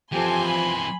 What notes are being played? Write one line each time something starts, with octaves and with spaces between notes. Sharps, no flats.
E3 F3 C4 G4 A4 G#5 C6
B5